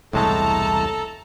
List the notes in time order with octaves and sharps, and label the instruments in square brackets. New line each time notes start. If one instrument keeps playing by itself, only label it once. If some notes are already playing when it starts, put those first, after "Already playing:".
[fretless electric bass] E1 C2 [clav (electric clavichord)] A2 G#3 A3 [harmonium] A4 [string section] A5 A#5